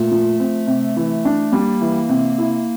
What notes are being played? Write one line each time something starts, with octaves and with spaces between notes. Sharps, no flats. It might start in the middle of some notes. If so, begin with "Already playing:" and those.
Already playing: A#2 A3
F3
C4
C3
E3
D4
G3 A#3
E3
C3
E4